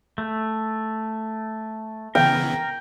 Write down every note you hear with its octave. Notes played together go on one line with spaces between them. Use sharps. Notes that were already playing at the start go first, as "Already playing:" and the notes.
A3
C#3 E3 B3 A#4 G5